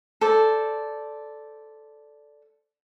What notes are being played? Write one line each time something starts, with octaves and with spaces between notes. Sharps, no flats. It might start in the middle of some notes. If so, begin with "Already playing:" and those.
A4 C5 D5